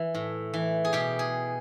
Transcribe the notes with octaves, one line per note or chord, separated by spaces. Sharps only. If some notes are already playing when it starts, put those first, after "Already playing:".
Already playing: E3
A2
E3
G#4
B2 G4
G#4